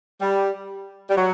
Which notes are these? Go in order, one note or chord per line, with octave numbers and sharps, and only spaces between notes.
G3
G3
F#3